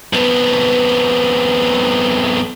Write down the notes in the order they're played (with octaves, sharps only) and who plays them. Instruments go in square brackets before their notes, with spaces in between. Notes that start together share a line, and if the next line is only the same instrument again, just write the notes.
[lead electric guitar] F2 B3